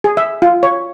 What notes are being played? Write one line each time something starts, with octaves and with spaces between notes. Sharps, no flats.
G#4
E5
F4
C#5